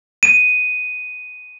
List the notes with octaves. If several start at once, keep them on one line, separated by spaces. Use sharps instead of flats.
D#7